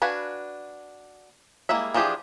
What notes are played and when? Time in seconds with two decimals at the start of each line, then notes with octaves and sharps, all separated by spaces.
0.02 D4 F#4 B4 F5 G#5
1.69 G3 G#3 A#3 E4 E5
1.94 E3 F3 D4 G4 G#4